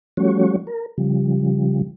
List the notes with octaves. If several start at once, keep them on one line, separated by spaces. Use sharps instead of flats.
F3 G3 A3 C#4 F#4 C#5
A#4
C#3 F3 G3